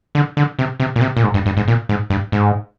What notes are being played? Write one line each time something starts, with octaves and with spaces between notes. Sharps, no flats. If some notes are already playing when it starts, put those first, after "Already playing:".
D3
D3
C3
C3
A#2
C3
A#2
G#2
G2
G2
G#2
A#2
G#2
G2
G#2